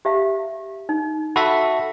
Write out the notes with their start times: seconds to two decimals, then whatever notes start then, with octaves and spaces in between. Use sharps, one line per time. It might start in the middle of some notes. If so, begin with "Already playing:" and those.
0.05 G4 E5 F5
0.89 D#4
1.36 F#4 A4 E5 B5